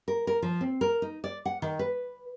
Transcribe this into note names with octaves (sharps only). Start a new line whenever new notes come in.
A#4
A#4
F3
C4
A#4
D#4
D5
F#5
D#3
B4